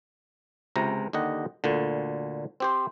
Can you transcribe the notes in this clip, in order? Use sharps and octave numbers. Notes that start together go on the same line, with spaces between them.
C#2 C3 A#5
D#2 D3 G4 D#5 F#5
D2 A#2 D3
C4 G4 C5